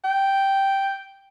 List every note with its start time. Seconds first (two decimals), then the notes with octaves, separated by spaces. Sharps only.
0.04 G5